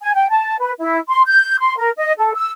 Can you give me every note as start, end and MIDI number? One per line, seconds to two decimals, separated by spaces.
0.01 0.13 80
0.14 0.26 79
0.30 0.56 81
0.60 0.72 71
0.78 0.98 64
1.09 1.22 84
1.27 1.59 91
1.59 1.75 84
1.77 1.90 70
1.97 2.12 75
2.18 2.32 69
2.34 2.50 88